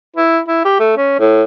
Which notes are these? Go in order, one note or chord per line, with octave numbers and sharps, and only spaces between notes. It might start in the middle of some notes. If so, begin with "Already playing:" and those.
E4
E4
G4
A3
C#4
A2